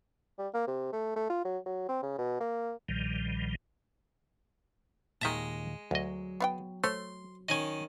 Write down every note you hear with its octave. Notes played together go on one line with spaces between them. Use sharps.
G3
A#3
C3
A3
A3
F4
F#3
F#3
C4
C#3
B2
A#3
B1 A#2 D#3 F3 G3
D#2 A#2 D#3 G#3 E5 A5 A#5
D2 F#3 D#5
B3 F5 G5
A3 A4 C5 C#5 C6
D#3 C#4 D#5 G#5